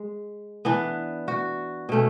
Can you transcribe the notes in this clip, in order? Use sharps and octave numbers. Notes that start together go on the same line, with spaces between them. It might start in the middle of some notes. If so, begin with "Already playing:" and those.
Already playing: G#3
E3 B3 D4
F#4
B2 A3 C#4